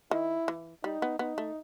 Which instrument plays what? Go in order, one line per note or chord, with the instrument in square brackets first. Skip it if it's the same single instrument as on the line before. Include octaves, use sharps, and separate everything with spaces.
[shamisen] D#3 [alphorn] E4
[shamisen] E3
[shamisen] G3 [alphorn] D#4
[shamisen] B3
[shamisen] B3 [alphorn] D#4
[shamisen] A3